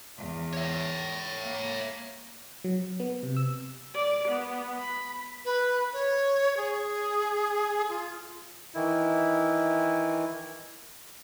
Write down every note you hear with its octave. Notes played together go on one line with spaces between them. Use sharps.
E2
C#5 E5
A#3
F#3
B3
C3
E6
D5
B3
B5
B4
C#5
G#4
F4
D#3 E3 E4